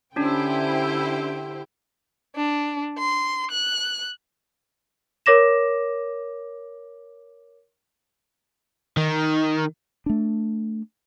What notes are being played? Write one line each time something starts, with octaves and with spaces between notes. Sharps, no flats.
D3 C#4 D4 E4 G4 C5 G5
D4
C6
F#6
A#4 C#5 D6 A#6 E7
D#3
A3 D4